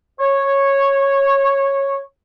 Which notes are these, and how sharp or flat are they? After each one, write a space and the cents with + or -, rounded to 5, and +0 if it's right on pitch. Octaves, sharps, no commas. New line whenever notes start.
C#5 -10